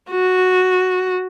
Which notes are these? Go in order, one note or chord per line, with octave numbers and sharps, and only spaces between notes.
F#4